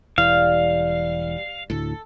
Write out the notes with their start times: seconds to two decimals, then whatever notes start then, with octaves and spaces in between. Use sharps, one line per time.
0.18 E1 E3 G3 F5
1.70 D2 A2 A4